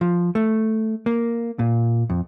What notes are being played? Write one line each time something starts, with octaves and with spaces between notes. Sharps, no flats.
F3
A3
A#3
A#2
F2